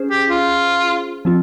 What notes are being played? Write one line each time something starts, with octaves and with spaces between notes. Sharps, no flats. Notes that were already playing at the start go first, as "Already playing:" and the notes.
Already playing: C#4 G#4 C5
G4
F4
F3 C4 F4